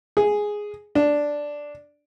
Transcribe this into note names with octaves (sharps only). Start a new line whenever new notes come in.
G#4
D4